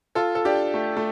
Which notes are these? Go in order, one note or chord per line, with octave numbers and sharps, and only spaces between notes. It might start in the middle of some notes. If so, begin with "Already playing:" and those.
F4 A4
A4
D4 G4
A3
A3